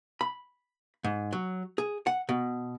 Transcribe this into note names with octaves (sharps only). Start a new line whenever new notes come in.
B5
G#2
F#3
G#4
F#5
B2